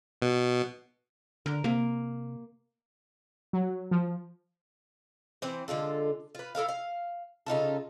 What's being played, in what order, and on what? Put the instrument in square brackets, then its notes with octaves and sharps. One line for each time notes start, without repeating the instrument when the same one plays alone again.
[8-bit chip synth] B2
[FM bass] D3 [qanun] A#4
[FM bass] C3 [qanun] A#3
[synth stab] F#3
F3
[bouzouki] E3 C4 C5
D3 G#3 F4 A4
F4 B4
E4 A4 A#4 F5
F5
C#3 D#4 F4 A4